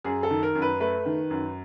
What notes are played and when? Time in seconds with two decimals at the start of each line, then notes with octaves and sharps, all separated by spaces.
0.04 F#2 G#4
0.23 A4
0.30 D#3
0.43 A#4
0.55 F#2
0.62 B4
0.80 A3 B4
1.05 D#3
1.30 F#2